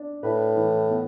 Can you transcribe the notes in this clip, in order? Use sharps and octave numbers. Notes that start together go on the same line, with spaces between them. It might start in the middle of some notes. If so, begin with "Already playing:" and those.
Already playing: D4
A2 B4
E3
B3